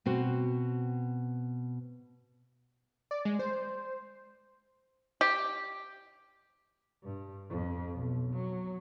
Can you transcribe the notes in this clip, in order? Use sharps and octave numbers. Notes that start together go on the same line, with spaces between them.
B2 C4 F#4
D5
G#3
C5
G4
G2
F2
B1
F#3